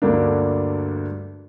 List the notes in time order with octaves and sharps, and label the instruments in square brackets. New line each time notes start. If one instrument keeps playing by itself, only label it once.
[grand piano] D2 G2 A3 A#3 D4